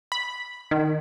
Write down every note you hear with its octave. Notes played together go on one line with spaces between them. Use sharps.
B5
D#3